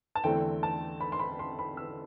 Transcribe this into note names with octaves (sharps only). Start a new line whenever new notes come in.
A5
E2 D3 A3 C4 G5
A5
B5
C6
B5
C6
B5
E6